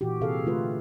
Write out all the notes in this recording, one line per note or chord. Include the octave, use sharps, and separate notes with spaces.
A#2 E3 F#4 G4
C3 G#4 A4 F5
D3 A3 F4 B4